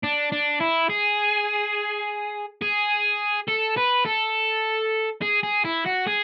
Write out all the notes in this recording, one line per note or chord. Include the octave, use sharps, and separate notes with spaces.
D4
D4
E4
G#4
G#4
A4
B4
A4
G#4
G#4
E4
F#4
G#4